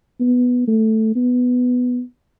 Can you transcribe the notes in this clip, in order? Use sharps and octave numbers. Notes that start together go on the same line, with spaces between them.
B3
A3
B3